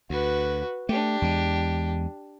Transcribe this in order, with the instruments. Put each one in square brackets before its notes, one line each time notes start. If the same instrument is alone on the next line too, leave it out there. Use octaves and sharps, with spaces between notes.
[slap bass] D2 [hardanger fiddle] F#4 B4
[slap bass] A3 [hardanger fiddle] D4 G4
[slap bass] E2 G#3